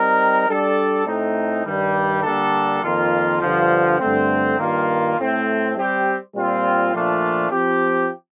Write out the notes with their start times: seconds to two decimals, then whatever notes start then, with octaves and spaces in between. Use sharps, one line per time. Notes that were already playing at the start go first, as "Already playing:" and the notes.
Already playing: G3 C4 D#4 A#4
0.48 G3 D4 A4 D5
1.06 A2 A3 C4 D#4
1.65 G2 D#3 G3
2.23 D3 G3 A#3 D4 A4
2.83 F2 D#3 A#3 F4
3.42 G2 D3 F3
4.00 G2 D3 A3 C4
4.58 G2 D#3 A#3 F4
5.17 A2 A3 C4
5.76 G3 C4 G4
6.35 A#2 G3 C4 F4
6.94 A#2 F3 A3 D4 F4
7.52 F3 C4 G4